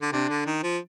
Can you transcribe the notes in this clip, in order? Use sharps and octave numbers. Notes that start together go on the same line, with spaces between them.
D3
C3 D4
D3
D#3
F3